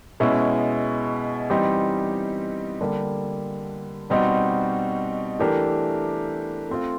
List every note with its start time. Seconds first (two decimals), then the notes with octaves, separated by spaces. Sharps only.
0.20 B2 G#3 C#4 E4
1.50 E3 G3 C4 D#4 G4
2.81 D3 G3 A#3
4.10 B2 G3 C4 D#4 F#4
5.39 E3 A3 D4 G4 A#4
6.69 A3 C4 F4